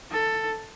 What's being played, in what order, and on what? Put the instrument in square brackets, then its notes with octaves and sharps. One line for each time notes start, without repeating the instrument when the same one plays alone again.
[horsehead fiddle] A4